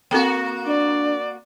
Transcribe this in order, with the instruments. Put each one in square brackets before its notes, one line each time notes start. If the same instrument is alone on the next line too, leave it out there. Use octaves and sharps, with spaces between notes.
[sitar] A#3 F#4 [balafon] C4 A4 G5
[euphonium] D4 [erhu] D5